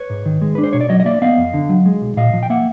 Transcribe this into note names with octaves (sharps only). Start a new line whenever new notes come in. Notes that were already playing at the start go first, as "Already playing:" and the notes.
Already playing: B4 C#5
G#2
D#3
G#3
B4
D4
C5
B2 C#5
D5
F#3 C#5 D#5
D#5
A#3 D5 E5
B3 D#5 F5
F2
D3
F#3
G#3
B1
A#2 D#5 F5
F3
G5
A#3 E5 F#5